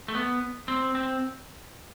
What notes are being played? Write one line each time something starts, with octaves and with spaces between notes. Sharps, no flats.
A3
B3
C4
C4